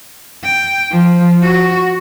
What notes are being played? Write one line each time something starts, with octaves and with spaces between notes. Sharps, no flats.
G5
F3
F#4